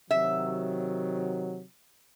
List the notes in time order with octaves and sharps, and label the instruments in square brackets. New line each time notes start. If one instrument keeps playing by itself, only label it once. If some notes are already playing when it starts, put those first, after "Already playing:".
[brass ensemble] C3 D#3 F#3 [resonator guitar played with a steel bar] E5